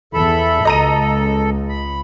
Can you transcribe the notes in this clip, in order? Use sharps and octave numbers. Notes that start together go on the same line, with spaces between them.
E2 A4 E5 B5
C#2 A4 D#5 A#5 D#7
B5